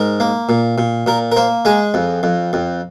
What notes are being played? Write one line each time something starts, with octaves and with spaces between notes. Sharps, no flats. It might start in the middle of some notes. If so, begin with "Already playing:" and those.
Already playing: G#2 A#4
A#3
A#2
A#2
A#2 A#4
A#4
A#3 C5
G#3 G#4
F2
F2
F2